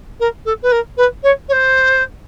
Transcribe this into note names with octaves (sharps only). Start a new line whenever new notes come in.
A#4
A4
B4
A#4
B4
C#5
C#5
C5